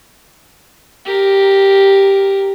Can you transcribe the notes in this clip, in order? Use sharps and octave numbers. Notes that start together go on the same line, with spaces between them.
G4 A#4